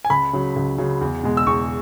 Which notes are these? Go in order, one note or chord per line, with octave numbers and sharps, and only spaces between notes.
G#5
C#2 B5
C#3 F#3
C#2
C#3 F#3
E2
B2 G#3
E6
E2 C#6